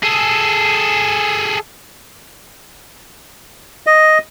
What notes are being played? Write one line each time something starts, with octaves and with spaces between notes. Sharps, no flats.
G#4 A4
D#5